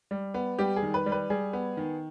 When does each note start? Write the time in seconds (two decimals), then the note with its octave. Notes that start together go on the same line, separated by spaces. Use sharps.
0.11 G3
0.34 B3
0.59 G3 G4
0.76 G#4
0.83 D#3
0.94 B4
1.06 G3
1.12 B4
1.30 G3 G#4
1.53 B3
1.77 D#3